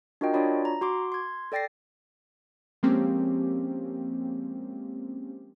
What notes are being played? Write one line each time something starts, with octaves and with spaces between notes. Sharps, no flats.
D4 F4 F#4 A#4 D#5 G5
D4 F4 F#4 C#5 D5 B5
A#5
F#4 C6 D6
C6 G#6
A4 D5 G5 A6 A#6 C7
F3 G#3 A#3 C4 C#4 G4